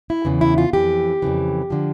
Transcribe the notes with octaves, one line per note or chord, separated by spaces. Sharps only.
E4
E2 C#3 E3
E4
F4
F2 E3 G4
F2 C#3 E3
D3 F3